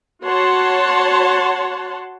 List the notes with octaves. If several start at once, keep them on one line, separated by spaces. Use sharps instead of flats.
F#4 C#5 F#5 A5 C6